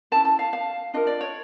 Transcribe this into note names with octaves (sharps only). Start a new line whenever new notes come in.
C#4 E4 G#4 B4 A5
A5
F5
F5
D4 F4 A#4 D#5
D5
C#5